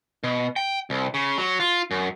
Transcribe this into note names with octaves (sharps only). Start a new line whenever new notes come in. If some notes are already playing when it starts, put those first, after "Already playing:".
B2
G5
C2
C#3
F#3
F4
F#2